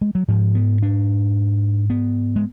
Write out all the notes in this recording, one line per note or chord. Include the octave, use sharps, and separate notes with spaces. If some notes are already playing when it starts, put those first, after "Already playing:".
G#3
F#3
G#2 F3
B3
D4
B3
G#3